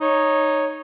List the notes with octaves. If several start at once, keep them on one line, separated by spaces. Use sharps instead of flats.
D#4 C#5